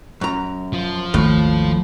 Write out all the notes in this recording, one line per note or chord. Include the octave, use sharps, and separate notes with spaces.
F#2 A#5
F3
G#1 D#2 A2